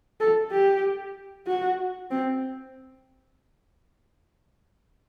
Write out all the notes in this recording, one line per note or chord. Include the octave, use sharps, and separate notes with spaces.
A4
G4
F#4
C4